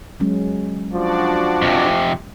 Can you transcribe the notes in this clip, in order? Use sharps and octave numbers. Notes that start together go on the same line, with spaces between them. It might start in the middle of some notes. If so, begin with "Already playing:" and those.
F#3 G#3 C#4
F3 D4 F#4 D5
F2 C3